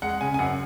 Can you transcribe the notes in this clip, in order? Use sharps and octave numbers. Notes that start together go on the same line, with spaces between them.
G#3 F#5
C#3 G#5
G#5
F#2 F#5